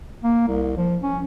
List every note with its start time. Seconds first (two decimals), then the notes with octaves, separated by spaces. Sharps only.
0.23 A#3
0.47 C2
0.77 F3
1.02 C#4